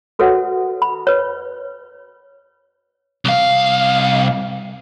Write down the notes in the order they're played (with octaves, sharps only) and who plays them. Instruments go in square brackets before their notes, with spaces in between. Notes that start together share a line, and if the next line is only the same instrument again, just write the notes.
[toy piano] F#4 A4 B4 C#5 E5 F#5
B5
B4 C#5
[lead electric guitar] C2 F5